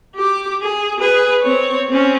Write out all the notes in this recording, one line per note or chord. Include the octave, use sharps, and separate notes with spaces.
G4 D6
G#4
G#4 B4
C4 C#5
C4 C#4